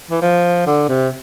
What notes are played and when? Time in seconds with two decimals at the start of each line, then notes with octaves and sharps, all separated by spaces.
0.11 E3
0.22 F3
0.67 D3
0.89 C3